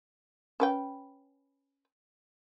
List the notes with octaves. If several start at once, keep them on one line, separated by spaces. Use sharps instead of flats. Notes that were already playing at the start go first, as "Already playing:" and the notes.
C#4 B4 G5